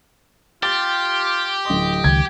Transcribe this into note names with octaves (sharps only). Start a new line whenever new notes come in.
F4 G4 A6
D1 D#5 C6
C#2 D#3 G#6